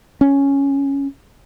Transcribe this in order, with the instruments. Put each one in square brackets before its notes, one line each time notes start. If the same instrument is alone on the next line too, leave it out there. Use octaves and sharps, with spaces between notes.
[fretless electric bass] C#4